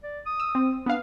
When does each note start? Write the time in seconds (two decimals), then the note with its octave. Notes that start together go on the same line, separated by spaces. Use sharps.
0.03 D5
0.26 D#6
0.40 E6
0.55 C4
0.86 B3 D4 F5